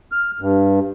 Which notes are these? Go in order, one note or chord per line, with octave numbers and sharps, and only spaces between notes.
F6
G2